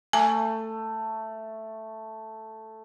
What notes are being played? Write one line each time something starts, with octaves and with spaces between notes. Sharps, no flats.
A3 G#5